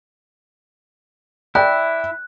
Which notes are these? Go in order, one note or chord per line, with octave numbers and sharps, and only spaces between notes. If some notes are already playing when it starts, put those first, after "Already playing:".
E4 D5 G5 F#6